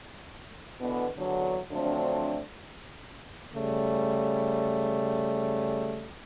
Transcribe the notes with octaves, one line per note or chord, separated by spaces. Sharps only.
B2 D3 E3 B3
E2 D3 F#3
D3 F3 F#3 A3 C4 D4
C#3 G3 A3